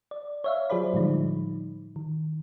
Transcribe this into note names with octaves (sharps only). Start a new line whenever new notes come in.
D5
C#5 E5 F5
F#3 F4 G#4 C5 D5 B5
A2 D3 F3 G3 G#3 D#4
D#3